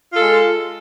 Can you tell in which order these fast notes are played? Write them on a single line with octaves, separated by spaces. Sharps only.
F4 A4 G#3